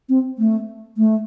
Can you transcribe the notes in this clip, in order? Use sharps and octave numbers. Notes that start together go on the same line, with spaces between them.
C4
A3
A3